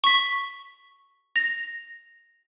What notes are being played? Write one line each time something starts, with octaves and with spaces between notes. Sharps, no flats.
C#6 B6
A#6 F7